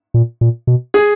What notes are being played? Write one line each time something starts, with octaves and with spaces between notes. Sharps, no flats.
A#2
A#2
B2
G#4